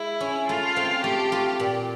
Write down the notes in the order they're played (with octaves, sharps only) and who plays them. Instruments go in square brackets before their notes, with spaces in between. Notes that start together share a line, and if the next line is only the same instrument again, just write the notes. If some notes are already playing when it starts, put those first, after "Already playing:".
Already playing: [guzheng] G#3 [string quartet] E4
[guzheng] C#4
[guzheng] A3 [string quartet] F4
[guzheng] C4
[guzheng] A3 [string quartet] G4
[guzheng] F4
A#2